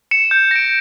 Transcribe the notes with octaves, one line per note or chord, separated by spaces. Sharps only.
C#7 E7
G6
A#6 D7